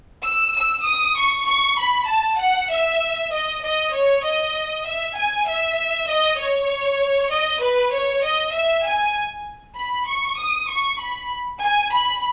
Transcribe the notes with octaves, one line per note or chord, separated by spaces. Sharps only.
E6
E6
D#6
C#6
C#6
B5
A5
F#5
E5
D#5
D#5
C#5
D#5
E5
G#5
E5
D#5
C#5
D#5
B4
C#5
D#5
E5
G#5
B5
C#6
D#6
C#6
B5
G#5
B5